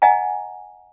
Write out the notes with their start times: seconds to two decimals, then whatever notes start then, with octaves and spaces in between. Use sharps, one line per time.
0.02 D#5 F#5 G#5 A#5